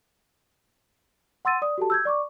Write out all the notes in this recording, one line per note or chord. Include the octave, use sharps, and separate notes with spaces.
F#5 C6 E6 A6 D#7
D5 D#6
F#4 G4 A4 A5
E6 G6 G#6
D5 C#6 D6